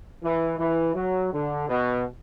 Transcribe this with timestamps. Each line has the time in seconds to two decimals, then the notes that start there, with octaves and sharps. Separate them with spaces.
0.22 E3
0.57 E3
0.94 F#3
1.32 D3
1.69 B2